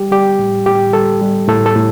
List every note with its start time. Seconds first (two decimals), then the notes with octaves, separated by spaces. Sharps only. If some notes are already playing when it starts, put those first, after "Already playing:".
Already playing: G3 G4
0.12 G3 G4
0.39 A2
0.66 A2 G4
0.93 G3 A4
1.21 G3
1.48 A2 A4
1.66 A4
1.76 A2